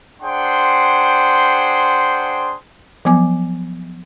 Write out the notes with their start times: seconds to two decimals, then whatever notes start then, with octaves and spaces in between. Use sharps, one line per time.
0.22 D4 G#4 C5 F#5 G5 C6
3.05 F3 F#3 B3 G#5 D6